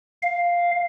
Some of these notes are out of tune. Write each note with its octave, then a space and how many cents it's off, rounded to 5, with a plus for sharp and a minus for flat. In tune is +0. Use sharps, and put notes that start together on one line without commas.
F5 +0